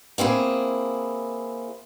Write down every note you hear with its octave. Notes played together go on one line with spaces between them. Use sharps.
A#3 C4 E4 G#4